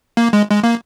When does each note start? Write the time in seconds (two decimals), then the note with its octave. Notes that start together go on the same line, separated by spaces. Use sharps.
0.17 A#3
0.33 G#3
0.50 G#3
0.63 A#3